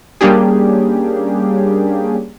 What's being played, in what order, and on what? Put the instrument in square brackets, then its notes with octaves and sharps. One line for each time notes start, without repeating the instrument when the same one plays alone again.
[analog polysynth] G3 A#3 C#4 D4 G4 G#4